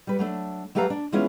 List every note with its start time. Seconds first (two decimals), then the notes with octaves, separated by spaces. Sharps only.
0.07 G3 B4
0.19 F#3 A3 D4
0.75 F#3 A3 G4 B4 F5 A#5
0.90 D4
1.12 E3 G#3 B3 C#4 E4 F4